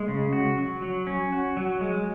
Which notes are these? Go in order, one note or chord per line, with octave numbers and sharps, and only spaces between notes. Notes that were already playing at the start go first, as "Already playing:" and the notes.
Already playing: G#3
C#3
F#4
F#3
F#3
C#4
F#4
F#3
G#3